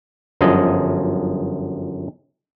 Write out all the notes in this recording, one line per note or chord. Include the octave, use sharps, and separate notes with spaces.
G1 F#2 F3 G#4 D#5